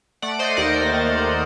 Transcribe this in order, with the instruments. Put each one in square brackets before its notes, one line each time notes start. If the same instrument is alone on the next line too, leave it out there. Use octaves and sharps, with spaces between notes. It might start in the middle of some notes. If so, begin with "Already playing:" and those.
[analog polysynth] A3 D5 F#5
C5 D#5
D#2 A#4 D5
A#4
D#3